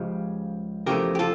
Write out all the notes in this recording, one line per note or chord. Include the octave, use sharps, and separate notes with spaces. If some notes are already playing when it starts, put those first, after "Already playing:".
Already playing: C#2 C#3 F3 G4
E2 C#3 F3 A3 G4 A#4
G4
F4 A4